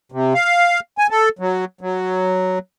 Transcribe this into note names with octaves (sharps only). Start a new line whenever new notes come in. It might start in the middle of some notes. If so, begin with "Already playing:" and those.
C3
F5
G#5
A4
F#3
F#3